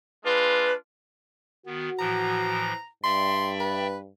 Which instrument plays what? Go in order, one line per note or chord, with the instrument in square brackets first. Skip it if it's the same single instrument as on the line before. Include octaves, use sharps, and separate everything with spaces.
[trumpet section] G#3 D4 F4 [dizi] B4
[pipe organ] D#3 B3 [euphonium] F#4
[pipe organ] A2 E3 F3 [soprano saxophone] A#5
[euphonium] G2 [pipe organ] D5 E5 G5 [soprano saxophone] C6
[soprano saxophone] B4